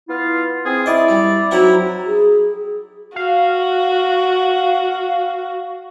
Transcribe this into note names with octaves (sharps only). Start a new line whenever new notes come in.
B3 E4 F4
C4 G#4
E4 D5 D#5
G3
F#3 C4 D#4 E4 A#4 F#5
G#4
F#4 F5